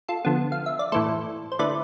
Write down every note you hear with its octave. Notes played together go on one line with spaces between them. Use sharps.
F4 A4
D3 F3 B3
F5
E5
D5
A2 E3 A3 A4 C5
C5
D3 A3 E4 B4 D5